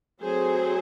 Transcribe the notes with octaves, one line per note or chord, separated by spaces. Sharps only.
F#3 A3 C4 G#4 C5